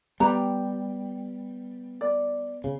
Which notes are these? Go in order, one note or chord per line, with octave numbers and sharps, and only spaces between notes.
G3 B3 G4 A#5
D5
C#3